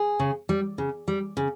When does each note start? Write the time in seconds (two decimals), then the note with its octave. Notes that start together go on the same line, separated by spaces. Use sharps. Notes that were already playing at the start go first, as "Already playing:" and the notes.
Already playing: G#4
0.19 C#3
0.49 G3
0.78 C#3
1.08 G3
1.37 C#3